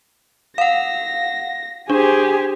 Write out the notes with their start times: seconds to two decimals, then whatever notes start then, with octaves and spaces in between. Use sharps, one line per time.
0.58 F5 F#5 A#6
1.90 D4 G4 G#4 C5 G#5